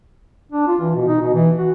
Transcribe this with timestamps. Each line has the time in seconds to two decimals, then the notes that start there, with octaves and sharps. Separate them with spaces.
0.52 D4
0.67 F4
0.80 E3
0.95 B2
1.08 D#4
1.21 B2
1.34 E3
1.58 F#4